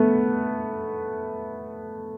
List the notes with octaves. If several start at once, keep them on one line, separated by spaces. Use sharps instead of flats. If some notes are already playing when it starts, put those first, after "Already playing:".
Already playing: A3 B3